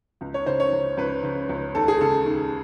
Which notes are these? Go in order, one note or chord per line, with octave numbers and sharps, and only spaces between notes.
C#2
C#5
C#3 C5
C#5
C#2
C#2 B4
C#3
C#2
D#2 A4
G#4
C#3 A4
D#2